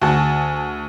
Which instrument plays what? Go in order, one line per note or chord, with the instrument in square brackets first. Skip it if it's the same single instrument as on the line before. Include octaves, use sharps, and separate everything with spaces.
[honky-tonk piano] D2 [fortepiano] F#4 G#4 A5 [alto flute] G#5